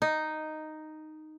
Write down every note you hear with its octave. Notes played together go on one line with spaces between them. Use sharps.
D#4